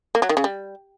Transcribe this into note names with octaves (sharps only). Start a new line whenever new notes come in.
A#3
F#3
D#3
C#3
G3